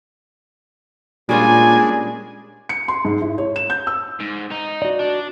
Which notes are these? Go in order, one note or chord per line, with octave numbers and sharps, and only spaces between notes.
A#2 G3 G#3 C#4 D4 F4 G#5
C#7
C6
G#2
E4
C#5
E7
G6
E6
G#2
D#4
F#4 D5
D4